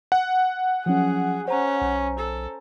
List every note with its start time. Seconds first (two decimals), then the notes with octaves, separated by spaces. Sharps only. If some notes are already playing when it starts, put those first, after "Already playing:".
0.12 F#5
0.86 F3 F#3 C#4 G#4
1.48 C#4 C5 A#5
1.82 B1
2.19 A4